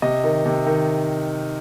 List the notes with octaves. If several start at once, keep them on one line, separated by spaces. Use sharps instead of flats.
C3 D#5
D#3
C3
D#3